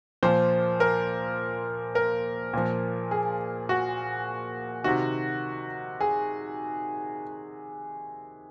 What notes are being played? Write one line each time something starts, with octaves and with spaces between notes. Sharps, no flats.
A#2 F3 C5
A#4
A#4
A#2 F3
G#4
F#4
C3 D#3 F#4
G#4